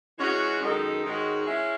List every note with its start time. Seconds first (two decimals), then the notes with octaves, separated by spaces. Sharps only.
0.18 E3 G#3 C#4 F#4
0.60 F#2 D#3 G#3 D#4 A4
1.03 G#2 D#3 G#3 C#4 F#4
1.46 G#3 C#4 E4